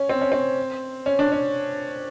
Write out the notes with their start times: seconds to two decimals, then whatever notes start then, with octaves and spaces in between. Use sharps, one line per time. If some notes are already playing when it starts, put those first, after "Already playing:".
Already playing: C#4
0.09 C4
0.21 C#4
0.32 C4
1.06 C#4
1.19 D4
1.32 C#4